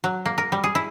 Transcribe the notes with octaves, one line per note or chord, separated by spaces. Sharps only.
F#3
A#3
A#4
G3
G#4
E4